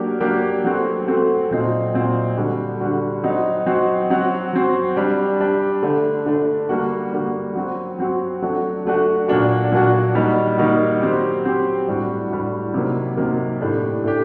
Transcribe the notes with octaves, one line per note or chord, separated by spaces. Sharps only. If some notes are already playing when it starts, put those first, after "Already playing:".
Already playing: F#3 A#3 D4 G4
F#3 A#3 D4 G4
F#3 A3 C4 F#4
F#3 A3 C4 F#4
A#2 F#3 C4 D#4
A#2 F#3 C4 D#4
D3 G3 D4 F#4
D3 G3 D4 F#4
F#3 C4 D#4 F#4
F#3 C4 D#4 F#4
F#3 C4 F#4
F#3 C4 F#4
G3 D4 G4
G3 D4 G4
D3 A3 D4
D3 A3 D4
D3 G3 A#3 F#4
D3 G3 A#3 F#4
F#3 C4 F#4
F#3 C4 F#4
F#3 A3 D4 F#4
F#3 A3 D4 F#4
A#2 F#3 A#3 D4 F#4
A#2 F#3 A#3 D4 F#4
D#3 G3 A#3 D#4 F#4
D#3 G3 A#3 D#4 F#4
F#3 C4 G4
F#3 C4 G4
A2 G3 D4 F#4
A2 G3 D4 F#4
C3 D#3 F#3 A#3
C3 D#3 F#3 A#3
A2 A3 D4 G4
A2 A3 D4 G4